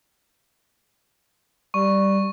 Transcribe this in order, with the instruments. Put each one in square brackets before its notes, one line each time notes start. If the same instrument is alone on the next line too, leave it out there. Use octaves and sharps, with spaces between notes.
[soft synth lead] G3 [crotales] C#6